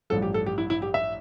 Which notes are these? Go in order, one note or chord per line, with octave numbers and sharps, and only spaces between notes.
A1 G2 F3 A4
G4
A4
G4
E4
E4
G4
E5